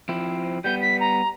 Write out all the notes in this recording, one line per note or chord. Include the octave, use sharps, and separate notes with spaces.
F3 C4 E4
G3 B3 G6
B6
A#5